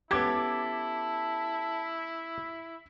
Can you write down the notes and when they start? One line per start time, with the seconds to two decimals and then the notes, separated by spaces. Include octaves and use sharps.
0.11 B3 C#4 E4 G4 A4 D6 G#6 B6